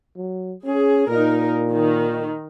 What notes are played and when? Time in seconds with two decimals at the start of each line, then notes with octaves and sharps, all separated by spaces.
0.17 F#3
0.65 C#4 G#4
1.08 A#2 D#4 A#4
1.71 D#3